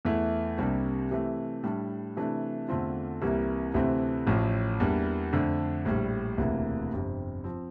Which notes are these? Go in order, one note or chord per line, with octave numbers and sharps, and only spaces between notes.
E2 E3 A3 E4
C2 C3 G3 A#3 D4
C3 E3 A3
A2 G3 D4
C3 E3 A3 D4
E2 D3 A3 C4 F4
C2 C3 E3 G3 A#3
D2 C3 E3 A3 C4
A1 A2 F3
E2 E3 G3 A#3 D4
F2 D3 A3 D4
A#1 A2 G3
E1 D2 C3 E3 A#3
G1 F2 C3
F3 C4